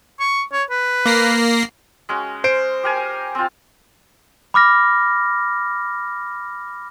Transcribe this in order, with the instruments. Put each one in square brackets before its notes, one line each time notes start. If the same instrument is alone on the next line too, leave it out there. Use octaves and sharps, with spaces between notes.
[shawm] C#6
C#5
B4
[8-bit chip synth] A#3 A#6 C7
[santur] G#3 C#4 F#4
[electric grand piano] C5 D7
[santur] G4 A#4 G#5
C4 F4
[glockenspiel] B5 D6 F6 A#6